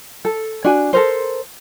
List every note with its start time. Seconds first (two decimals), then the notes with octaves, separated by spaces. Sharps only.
0.25 A4
0.65 D4 F#4 G#5
0.93 A4 A#4 C5